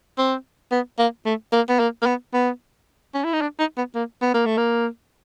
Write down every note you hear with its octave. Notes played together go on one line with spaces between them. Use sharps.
C4
B3
A#3
A3
A#3
B3
A#3
A#3
B3
B3
C#4
E4
D#4
D4
D#4
B3
A#3
B3
A#3
A3
A#3